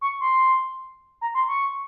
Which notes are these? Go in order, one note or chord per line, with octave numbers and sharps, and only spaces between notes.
C#6
C6
A#5
C6
C#6